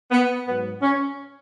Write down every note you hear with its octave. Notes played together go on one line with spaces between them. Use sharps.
B3
G#2 F#3 B3
C#4